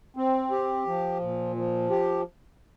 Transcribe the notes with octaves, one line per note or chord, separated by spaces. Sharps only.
C4
G4
F3
A#2
F3
G4